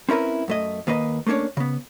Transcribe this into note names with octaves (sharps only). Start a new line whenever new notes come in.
C4 C#4 E4 A#4 B4
F#2 A3 D#5
D#2 A#3 B4 C5 D#5
A3 A#3 C#4 D4 C#5
C#3 B3